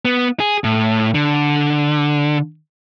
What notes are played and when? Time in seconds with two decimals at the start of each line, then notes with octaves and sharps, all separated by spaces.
0.05 B3
0.40 G#4
0.64 A2
1.15 D3